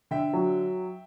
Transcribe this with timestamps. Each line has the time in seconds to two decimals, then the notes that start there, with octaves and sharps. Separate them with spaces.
0.11 D3 E5 G5
0.33 F#3